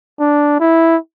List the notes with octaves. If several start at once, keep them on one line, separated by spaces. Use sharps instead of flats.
D4
E4